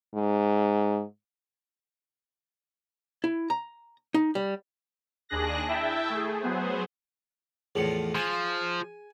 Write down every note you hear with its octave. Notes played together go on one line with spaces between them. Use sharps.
G#2
E4
A#5
D#4
G3
D#2 D4 G#4 F#6 A#6
E4 E5 G5 A5
A3 G#4
F#3 B3 G#4 C5
E2 A2 F3 G#4 C#7
F3 G#5